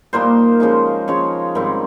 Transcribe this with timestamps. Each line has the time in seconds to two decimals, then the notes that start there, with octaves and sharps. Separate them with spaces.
0.13 A#2 G3 A#3 D#4 C5
0.60 C#3 F3 G#3 D#4
1.08 C#3 F3 G#3 D#4 C#5
1.55 G#2 D#3 G3 C4